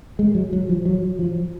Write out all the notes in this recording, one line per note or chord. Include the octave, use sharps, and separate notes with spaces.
G#3
F#3
F#3
F3
F#3
F3